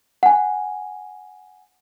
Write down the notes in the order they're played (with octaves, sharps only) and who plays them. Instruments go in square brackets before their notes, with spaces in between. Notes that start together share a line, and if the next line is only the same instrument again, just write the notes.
[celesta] F#5 G#5